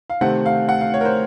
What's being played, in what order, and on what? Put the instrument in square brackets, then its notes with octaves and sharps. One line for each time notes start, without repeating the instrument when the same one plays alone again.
[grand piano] F5
C3 D#3 A3 C4 F#5
F5
F#5
F5
C#5
A#4
C5